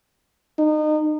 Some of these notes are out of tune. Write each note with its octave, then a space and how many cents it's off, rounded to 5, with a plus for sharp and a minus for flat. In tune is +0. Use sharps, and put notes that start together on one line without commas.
D#4 -30